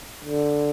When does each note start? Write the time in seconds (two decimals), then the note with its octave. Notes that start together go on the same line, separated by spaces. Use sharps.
0.24 D3